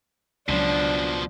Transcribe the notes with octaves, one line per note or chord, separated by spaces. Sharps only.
C#2 B2 F3 F#3 D4